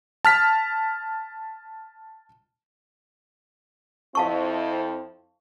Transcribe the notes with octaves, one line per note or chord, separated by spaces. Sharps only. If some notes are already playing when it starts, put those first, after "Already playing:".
A5 F6 B6
F2 C4 E4 F5 A5 C#6